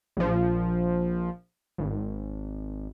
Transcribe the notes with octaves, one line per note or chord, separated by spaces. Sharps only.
A#1 F3
G#1